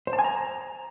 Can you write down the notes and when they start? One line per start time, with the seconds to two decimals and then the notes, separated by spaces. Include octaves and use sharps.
0.07 C5
0.13 A5
0.19 G#5
0.24 A#5